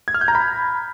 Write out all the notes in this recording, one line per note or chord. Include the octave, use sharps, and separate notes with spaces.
G#6
F6
G6
A#5
B5